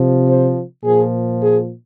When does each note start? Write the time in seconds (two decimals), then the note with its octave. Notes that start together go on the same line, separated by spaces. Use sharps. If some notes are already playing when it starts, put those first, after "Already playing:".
Already playing: C3 F3
0.28 C5
0.84 A#2 F3 G#4
1.40 G#4